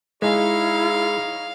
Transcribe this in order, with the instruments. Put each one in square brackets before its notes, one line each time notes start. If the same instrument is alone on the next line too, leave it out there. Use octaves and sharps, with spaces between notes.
[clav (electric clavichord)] G#3 [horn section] D#4 G#4 C#5 [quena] E4 [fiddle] F5